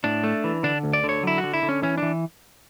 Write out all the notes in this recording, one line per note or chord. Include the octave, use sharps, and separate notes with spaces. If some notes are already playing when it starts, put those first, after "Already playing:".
A2 D4
A3
E3
D3 D4
D2
D5
D3
C#5
F#3 E4
F#4
D3
E4
D3
C#4
E3 C#4
E3 D4